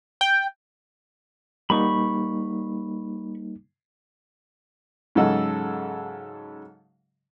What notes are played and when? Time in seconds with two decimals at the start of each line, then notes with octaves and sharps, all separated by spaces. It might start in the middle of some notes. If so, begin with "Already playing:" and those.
0.21 G5
1.70 G3 A#3 D#4 B5 C#6
5.15 G#2 C#3 F#3 A4 D#5 F#5